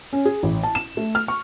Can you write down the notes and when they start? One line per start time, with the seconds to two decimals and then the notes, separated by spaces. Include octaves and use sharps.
0.13 C#4
0.25 G#4
0.43 A1
0.63 A5
0.75 E7
0.97 A3
1.15 F6
1.28 C#6